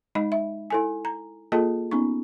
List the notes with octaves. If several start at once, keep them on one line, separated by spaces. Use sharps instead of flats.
G#3 D#4 D#5 B5
E5
E4 A4 G#5
A#5
A#3 F4 G#4 A4 D#5 A5
B3 C#4 D#4 C#6